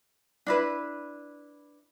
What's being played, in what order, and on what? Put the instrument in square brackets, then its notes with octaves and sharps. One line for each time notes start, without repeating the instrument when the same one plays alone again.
[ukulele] D4 E4 B4